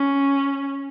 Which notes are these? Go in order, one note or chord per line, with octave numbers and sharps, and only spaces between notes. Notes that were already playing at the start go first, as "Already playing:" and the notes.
Already playing: C#4